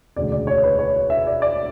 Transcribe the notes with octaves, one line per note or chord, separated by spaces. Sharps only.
E1 D2 C#3 D5
D5
C#5
B4
C#5
E5
D5
D5